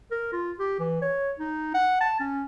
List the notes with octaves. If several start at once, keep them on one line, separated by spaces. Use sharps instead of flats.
A#4
F4
G4
E3
C#5
D#4
F#5
A5
C#4